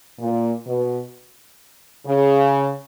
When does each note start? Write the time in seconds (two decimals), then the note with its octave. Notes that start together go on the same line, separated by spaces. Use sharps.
0.19 A#2
0.66 B2
2.06 C#3